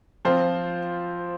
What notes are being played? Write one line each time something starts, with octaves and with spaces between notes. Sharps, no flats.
F3 C4 F4 C5